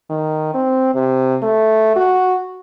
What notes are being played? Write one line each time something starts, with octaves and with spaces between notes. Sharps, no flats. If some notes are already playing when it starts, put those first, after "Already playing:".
D#3
C4
C3
A3
F#4